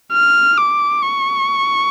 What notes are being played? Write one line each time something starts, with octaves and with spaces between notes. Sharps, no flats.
F6
D6
C#6